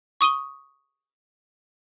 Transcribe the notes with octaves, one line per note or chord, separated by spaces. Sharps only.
C#6 D#6 D#7 G7